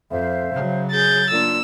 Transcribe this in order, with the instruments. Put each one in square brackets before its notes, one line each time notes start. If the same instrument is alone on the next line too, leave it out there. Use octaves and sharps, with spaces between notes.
[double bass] F2 [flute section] C5 E5 F5
[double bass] C#3 F#3
[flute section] G#4 [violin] G6 A6
[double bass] A#3 [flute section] D4 F4 D5 [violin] E6